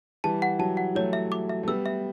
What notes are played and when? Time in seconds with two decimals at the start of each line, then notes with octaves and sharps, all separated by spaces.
0.24 E3 G3 A5
0.42 F#5
0.59 F#3 A5
0.77 F#5
0.95 F#3 A3 C#5
1.13 E5
1.32 D6
1.49 E5
1.63 A3
1.67 G3 B3 E6
1.86 E5